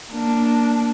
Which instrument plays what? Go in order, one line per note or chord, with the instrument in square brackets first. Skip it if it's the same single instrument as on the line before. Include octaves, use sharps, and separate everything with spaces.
[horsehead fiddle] A#3 D4